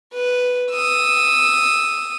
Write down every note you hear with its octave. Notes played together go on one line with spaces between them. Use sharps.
B4
D#6 E6